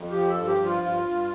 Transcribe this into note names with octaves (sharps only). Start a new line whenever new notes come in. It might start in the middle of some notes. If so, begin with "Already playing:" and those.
Already playing: F2
F3 G4
A4
G2
G4
F3
F4
G2 F4
G2